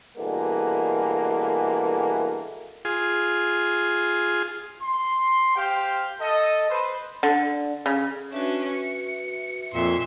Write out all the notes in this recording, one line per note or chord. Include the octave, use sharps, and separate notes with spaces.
B2 D3 E3 G3 G#3 A#3
F4 G#4
C6
G4 C5 F5 G5
A4 D#5
B4 C5
D3
C#3
C#4 D4 F#4 B4 E5
C#7
F2 A#2 E5 C6